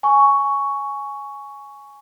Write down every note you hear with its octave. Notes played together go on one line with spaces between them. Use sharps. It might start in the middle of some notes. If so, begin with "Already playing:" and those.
G#5 C#6